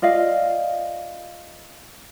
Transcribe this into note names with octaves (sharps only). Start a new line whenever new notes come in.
F4 D5 D#5 F5